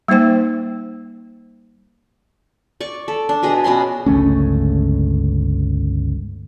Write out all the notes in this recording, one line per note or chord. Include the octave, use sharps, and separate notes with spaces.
G3 A#3 D#4 C5 G5
D5 C#6
A4
D4
B2 G#4 D#5
B2 B3 C#4 C6
G1 C#2 A3 C#4